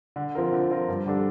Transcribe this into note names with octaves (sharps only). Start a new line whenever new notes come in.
D3
F3 C4 F4 A#4
D3
F3 C4 F4 A#4
G2
D3 G3 D4 A4